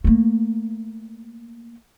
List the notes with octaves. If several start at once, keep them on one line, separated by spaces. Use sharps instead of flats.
A3 A#3